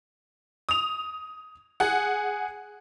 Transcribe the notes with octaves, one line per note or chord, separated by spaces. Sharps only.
D#6 F7
G#4 F#5